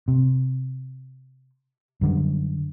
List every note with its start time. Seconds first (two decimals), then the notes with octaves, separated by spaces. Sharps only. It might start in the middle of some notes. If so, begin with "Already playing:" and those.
0.08 C3
2.01 F#2 D3 G3